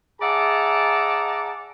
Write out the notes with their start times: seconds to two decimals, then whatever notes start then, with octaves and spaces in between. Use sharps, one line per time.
0.20 G#4 D5 E5 F#5 A5 A#5